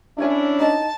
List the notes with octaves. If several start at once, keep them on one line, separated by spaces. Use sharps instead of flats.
C#4 D4 E4 A#4 C#5 G#5
D#4 D#5 A5